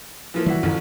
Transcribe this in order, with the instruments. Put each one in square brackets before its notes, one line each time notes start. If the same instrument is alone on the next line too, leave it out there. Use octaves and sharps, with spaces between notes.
[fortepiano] E3 F3 A#3
[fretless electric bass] E3 G3 [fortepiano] E4 F#4
[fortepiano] A1 F3 [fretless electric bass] F#2 D#3